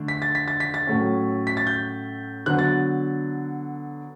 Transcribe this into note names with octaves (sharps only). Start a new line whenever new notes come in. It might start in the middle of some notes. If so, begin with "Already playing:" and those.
Already playing: D3 A3 D4
B6
A6
B6
A6
B6
A6
A2 F#3 A3 C#4
B6
A6
G6
D3 F#3 B3 F#6
A6